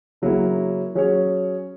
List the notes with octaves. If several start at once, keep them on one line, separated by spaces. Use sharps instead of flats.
C#3 F#3 A#3 C#4 E4
F#3 C#4 G#4 C#5